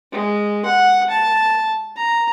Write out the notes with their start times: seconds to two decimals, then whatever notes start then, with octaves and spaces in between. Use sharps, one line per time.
0.12 G#3
0.65 F#5
1.10 A5
1.96 A#5